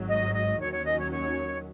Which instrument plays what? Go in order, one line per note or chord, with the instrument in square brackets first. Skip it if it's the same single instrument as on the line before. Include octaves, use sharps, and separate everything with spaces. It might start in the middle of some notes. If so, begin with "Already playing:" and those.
Already playing: [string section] G#1 G#2 F#3
[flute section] D#5
D#5
[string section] D#2 D#3 F#3 C#4 [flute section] C#5
[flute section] C#5
D#5
C#5
C#5